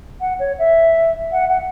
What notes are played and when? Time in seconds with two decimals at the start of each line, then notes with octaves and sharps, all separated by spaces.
0.20 F#5
0.39 C#5
0.58 E5
1.32 F#5
1.49 F#5